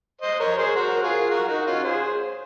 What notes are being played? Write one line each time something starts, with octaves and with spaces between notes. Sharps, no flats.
C5 D#5
A#4 C#5
G#4 C5
F#4 A#4
F4 G#4
F#4 A#4
D#4 F#4
C#4 F4
G#4 C5